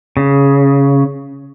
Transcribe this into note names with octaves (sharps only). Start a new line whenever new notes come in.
C#3